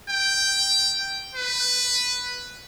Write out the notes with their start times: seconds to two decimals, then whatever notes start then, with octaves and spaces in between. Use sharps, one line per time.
0.10 G5
1.35 B4